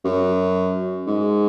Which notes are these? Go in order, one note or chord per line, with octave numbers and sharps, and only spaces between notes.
F#2
G#2